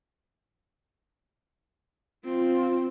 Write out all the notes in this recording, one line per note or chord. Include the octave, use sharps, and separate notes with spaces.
C4 F4